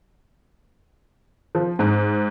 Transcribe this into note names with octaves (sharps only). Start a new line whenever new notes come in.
F3
G#2